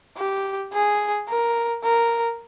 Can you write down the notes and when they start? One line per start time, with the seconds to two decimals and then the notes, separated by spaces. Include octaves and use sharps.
0.17 G4
0.73 G#4
1.29 A#4
1.84 A#4